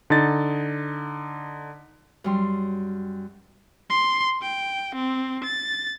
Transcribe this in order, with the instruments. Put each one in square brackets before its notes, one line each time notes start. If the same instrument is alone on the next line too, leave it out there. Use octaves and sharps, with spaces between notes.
[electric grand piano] D3 D#4 A6
[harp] F#2 G3 C6
[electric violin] C6
G5
C4
A6